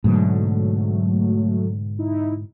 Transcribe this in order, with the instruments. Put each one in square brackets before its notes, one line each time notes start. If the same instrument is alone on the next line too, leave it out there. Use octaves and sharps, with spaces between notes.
[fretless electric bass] G#2 B2 D3 [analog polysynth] F#3 A3
[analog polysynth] D#4 E4